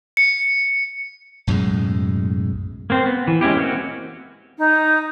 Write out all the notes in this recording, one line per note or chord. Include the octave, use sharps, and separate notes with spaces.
C#7
B1 F#2 A2 G#3
A#3 C4
B3
E3
G#3 C#4 E4 G4
A#3 C4 F#4
D#4